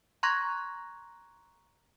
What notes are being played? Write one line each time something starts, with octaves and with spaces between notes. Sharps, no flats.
A#5 C6 C#6 F#6 G#6 A#6